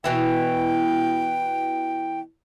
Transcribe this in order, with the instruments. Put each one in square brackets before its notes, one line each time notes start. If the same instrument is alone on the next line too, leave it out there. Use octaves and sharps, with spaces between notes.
[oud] B2 E3 E4 [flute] G5